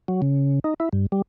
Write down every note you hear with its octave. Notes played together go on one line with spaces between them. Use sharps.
F#3
C#3
D#4
E4
G2
G3